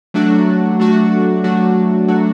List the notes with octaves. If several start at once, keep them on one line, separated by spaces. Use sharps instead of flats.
F#3 A3 D4 F#4
F#3 A3 D4 F#4
F#3 A3 D4 F#4
F#3 A3 D4 F#4